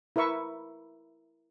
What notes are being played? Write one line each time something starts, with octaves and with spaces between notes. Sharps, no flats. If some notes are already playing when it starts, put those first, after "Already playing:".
E4 A#4 B4 E5 C#6